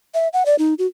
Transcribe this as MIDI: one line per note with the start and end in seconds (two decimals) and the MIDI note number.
0.14 0.28 76
0.33 0.43 78
0.46 0.56 74
0.59 0.74 63
0.79 0.87 66